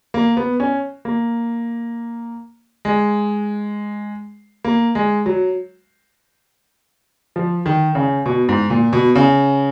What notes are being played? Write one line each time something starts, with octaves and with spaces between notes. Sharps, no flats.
A#3
B3
C#4
A#3
G#3
A#3
G#3
F#3
F3
D#3
C#3
B2
G#2
A#2
B2
C#3